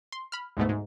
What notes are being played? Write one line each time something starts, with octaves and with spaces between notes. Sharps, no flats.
C6
B5 F6
D2 G#2 B2 A3
G#2